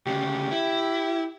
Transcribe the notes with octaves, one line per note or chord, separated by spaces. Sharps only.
D2 C#3 G4
E4